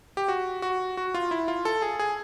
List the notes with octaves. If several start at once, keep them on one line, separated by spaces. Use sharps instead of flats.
G4
F#4
F#4
F#4
F4
E4
F4
A4
G#4
G#4